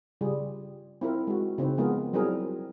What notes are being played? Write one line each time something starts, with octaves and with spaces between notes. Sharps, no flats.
C#3 G3 F4 G#4
C4 E4 F4 A#4
G#3 F#4
C#3 C4 D#4 B4
F3 G#3 B3 F4 G#4 A#4
F#3 G3 C4 E4 G#4 A#4